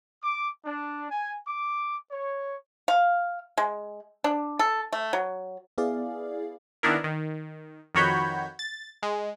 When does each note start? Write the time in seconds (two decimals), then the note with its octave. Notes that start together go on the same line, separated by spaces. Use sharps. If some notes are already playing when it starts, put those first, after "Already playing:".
0.23 D6
0.65 D4
1.11 G#5
1.48 D6
2.11 C#5
2.88 F5
3.58 G#3
4.24 D4
4.59 A4
4.93 A3
5.13 F#3
5.78 B3 E4 G#4 D5 F5
6.83 D#3 B3 D4 E4 A#4
7.04 D#3
7.95 F2 D#3 F#4 C#5 B5 G6
8.59 A6
9.03 G#3